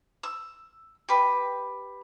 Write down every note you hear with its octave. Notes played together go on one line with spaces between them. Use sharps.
E6
G4 B4